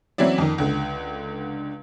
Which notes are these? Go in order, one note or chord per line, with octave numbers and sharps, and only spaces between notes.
E3 F#3 C4 C#4 E4 D5
F2 D#3
C#2 D3